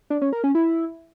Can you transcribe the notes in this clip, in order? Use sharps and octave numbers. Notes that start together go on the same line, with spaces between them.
D4
C#4
A#4
C#4
E4